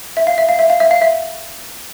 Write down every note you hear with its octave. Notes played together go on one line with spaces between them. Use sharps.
E5
F5
E5
F5
E5
F5
E5
F5
E5